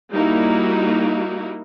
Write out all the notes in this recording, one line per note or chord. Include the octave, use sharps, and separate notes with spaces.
G3 A#3 D#4 E4 F#4